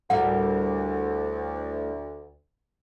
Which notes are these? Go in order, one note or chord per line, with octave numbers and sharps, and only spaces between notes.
D2 A2 G3 A#4 F#5